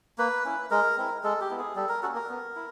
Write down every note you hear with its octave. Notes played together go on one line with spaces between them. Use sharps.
A#3 B4
C#4 E4
G#3 A#4
C4 E4
G#3 A4
G4
B3 E4
G#4
G3 A4
A#4
A#3 C#4 F#4 A4
A#4
B3
E4